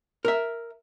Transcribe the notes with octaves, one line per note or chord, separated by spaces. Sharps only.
A#4 E5